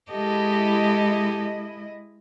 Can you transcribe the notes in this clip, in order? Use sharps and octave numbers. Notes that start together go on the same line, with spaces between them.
G#3 E4 G4 A4 D#5